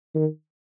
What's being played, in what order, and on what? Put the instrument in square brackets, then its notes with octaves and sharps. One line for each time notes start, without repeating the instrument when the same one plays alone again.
[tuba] D#3